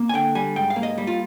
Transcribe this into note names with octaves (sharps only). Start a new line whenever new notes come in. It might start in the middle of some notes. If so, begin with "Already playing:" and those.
Already playing: A#3
G#5
D3 G5
G3 G#5
G#2 G5
F5
A#3
D#5
G3
F4